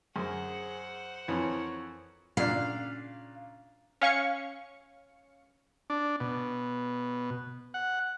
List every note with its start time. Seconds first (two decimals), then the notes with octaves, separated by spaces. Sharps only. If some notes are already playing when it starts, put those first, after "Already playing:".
0.16 F#2 G#4 C5 F#5
1.28 F2 E3 A#4 C#5
2.37 A#2 C#3 D4 F5
4.01 C#4 F5 C#6 C#7
5.90 D4
6.20 B2
7.74 F#5